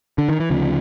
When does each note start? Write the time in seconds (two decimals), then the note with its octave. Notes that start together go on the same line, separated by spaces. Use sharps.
0.18 D3
0.29 D#3
0.40 E3
0.50 D2 C#3 F3